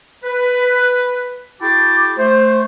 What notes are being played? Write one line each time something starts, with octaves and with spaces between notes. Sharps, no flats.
B4
E4 F#4 G#4 G5 A5 D6
A3 C5